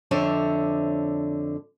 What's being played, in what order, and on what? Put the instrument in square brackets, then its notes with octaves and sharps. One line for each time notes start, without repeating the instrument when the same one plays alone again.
[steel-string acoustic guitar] F2 D3 D4 C5 C#5 E5